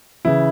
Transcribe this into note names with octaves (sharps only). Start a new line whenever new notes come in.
C#3 E3 E4